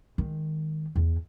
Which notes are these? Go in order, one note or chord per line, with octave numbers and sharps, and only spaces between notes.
D#3 G#3
E2